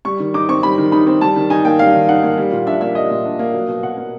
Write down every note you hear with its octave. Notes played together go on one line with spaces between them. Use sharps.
G3 C#6
D#3
D#4 D6
C4 C#6
G3 B5
D#3
D#4 B5
C4
G3 A5
D#3
D#4 G#5
A#3 G5
G3 F5
D#3
D#4 F#5
A#3
G3
A#2
D4 E5
A#3 E5
G3 D#5
A#2
D4
A#3
F#3
B2
B2 F#5
A#3